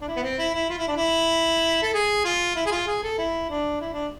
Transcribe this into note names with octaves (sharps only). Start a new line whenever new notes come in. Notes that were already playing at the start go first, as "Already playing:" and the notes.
D4
E4
B3
C4
E4
E4
F4
E4
D4
E4
A4
G#4
F4
E4
G#4
F4
G#4
A4
E4
D4
E4
D4